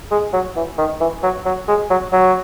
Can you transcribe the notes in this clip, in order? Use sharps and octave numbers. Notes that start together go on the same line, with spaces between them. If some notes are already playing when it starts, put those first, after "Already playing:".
G#3
F#3
E3
D#3
E3
F#3
F#3
G#3
F#3
F#3